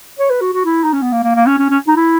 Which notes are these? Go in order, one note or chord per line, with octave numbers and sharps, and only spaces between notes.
C#5
B4
F#4
F#4
E4
D#4
C#4
B3
A#3
A#3
A#3
C#4
C#4
C#4
D#4
E4